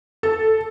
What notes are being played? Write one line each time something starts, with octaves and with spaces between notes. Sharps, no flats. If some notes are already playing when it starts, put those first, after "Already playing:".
A4